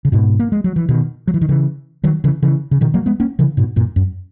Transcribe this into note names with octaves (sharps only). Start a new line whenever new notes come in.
C#3
G#2 B2
A#3
G#3
F#3
E3
B2 D#3
F#3
E3
D#3
C#3 E3
D#3 F#3
C#3 E3
C#3 E3
C#3
B2 D#3
F#3 A#3
G#3 B3
A#3 C#4
C#3 E3
G#2 B2
F#2 A#2
F#2